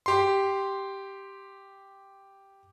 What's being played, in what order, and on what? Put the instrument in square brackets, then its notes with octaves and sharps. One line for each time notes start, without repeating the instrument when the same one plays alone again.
[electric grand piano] G4 C6